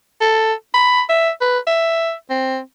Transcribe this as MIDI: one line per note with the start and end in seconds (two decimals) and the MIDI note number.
0.21 0.53 69
0.74 1.01 83
1.09 1.30 76
1.41 1.59 71
1.67 2.12 76
2.30 2.59 60